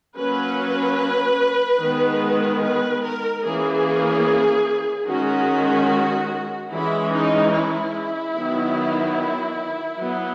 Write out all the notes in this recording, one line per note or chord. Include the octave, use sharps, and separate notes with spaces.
F#3 A#3 C#4 B4
D#3 G#3 B3
B4
A#4
E3 A#3 C#4 G#4
D#3 G#3 C#4 F#4
E3 G#3 C#4 E4
D#4
E4
D#3 F#3 B3
F#3 B3